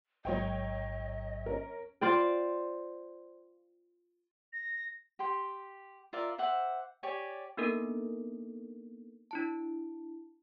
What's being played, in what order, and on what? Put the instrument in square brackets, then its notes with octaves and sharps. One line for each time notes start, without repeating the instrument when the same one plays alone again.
[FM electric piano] A1 G#2 [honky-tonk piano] F#3 C#5 G5 [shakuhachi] D#5
[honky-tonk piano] C#4 A#4
[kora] F4 C5 D5 G5
[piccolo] A#6
[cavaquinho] G4 G5 C6
F4 A#4 D5 E5
C5 E5 F#5 D6
G4 C#5 D5 G#5
[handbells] A#3 B3 D4 D#4 A4 A#4
D4 E4 A5